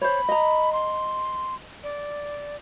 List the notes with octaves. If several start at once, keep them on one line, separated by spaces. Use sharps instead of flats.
C5 C#5 B5
D#5 A#5
C6
D5